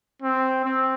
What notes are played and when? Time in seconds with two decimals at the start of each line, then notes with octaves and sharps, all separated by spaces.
0.22 C4
0.65 C4